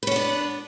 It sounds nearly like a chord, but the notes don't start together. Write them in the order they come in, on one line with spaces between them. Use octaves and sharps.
B4 C#4 B3 D4